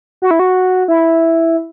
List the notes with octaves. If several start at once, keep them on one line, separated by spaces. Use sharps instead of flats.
F#4
E4
F#4
E4